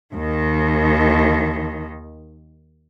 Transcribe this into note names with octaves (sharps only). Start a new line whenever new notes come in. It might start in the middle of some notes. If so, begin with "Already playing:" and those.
D#2 D#3